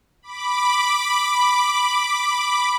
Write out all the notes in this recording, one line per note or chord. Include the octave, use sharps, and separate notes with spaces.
B5 D6